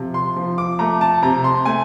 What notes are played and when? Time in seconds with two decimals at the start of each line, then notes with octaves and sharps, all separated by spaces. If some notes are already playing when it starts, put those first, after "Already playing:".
Already playing: C3 F3
0.14 C6
0.36 F3
0.58 D6
0.79 A3 A#5
1.01 A5
1.22 C3 A#5
1.44 C6
1.65 A3 G#5